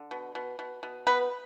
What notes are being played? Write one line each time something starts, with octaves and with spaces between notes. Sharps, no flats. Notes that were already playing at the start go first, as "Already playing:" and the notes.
Already playing: D3
B2
B2
B2
B2
B3 B4